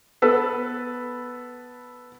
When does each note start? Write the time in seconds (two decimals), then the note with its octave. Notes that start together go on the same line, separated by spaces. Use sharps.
0.22 B3 A4 B4